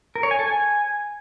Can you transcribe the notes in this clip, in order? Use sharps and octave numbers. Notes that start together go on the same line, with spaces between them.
A#4
C#5
G#5
A4
G#5